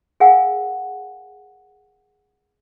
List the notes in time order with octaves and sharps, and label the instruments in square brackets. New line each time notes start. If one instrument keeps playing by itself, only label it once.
[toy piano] G#4 A#4 F5 F#5 G#5